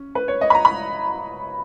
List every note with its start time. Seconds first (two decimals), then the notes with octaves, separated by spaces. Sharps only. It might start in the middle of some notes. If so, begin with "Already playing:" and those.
Already playing: C#4
0.15 B4
0.28 C#5
0.41 D#5
0.50 B5
0.55 A#5
0.65 B5